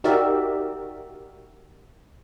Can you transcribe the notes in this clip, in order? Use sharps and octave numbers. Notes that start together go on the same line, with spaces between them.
D#4 F#4 G4 A#4 D5 E5